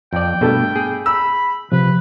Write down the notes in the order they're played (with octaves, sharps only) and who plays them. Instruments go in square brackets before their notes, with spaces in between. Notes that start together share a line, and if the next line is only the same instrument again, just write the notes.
[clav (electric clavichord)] F2 D5 [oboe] G5
[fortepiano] G2 A3 [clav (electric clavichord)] B2
[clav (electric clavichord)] G#4
[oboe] B5 [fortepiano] E6
[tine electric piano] C3 F3 [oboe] B4